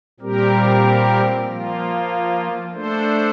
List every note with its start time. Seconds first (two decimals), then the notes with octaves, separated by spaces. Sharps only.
0.20 A#2 G3 C4 G4 A#4
1.47 F3 A#3 F4
2.73 A3 D4 A4 C5